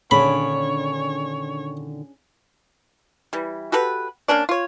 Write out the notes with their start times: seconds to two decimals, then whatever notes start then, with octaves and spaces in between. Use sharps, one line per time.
0.11 A#2 D3 D#3 C#4 D4 G#4 C#5 B5
3.33 E3 G3
3.72 F#4 G4 A4 B4
4.28 A#3 C#4 D4 D5
4.49 F4 C#5